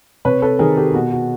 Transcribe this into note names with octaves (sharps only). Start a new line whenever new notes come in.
C3 B4 C#5
A4 B4
D#3 G#4 A#4
G4 A4
G4
B2 F#4
F#4